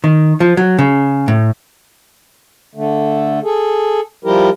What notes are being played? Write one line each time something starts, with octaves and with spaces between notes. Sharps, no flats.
D#3
F3
F#3
C#3
A2
D3 A3
G#4 A4
F3 G3 E4 G4 A#4